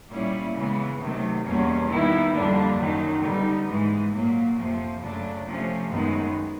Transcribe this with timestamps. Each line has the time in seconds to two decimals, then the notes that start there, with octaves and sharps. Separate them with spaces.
0.10 A#2 G3 A#3 C#4 E4
0.55 C#3 E3 G#3 B3
0.99 C3 D#3 F#3 A3
1.44 E2 B2 G3 A#3 C#4
1.89 D#3 G3 B3 E4
2.33 F2 D3 G3 A#3 D4
2.78 F#2 D#3 F#3
3.23 D3 G3 B3 D#4
3.67 G#2 E3 G#3
4.12 A#2 F#3 A#3
4.57 F2 C3 F3
5.01 F#2 C#3 F#3 A3 D4
5.46 C3 F3 A3 C#4
5.90 F#2 D#3 G#3 B3